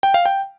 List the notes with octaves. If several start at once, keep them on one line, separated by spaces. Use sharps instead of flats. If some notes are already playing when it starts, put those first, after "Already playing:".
G5
F5
G5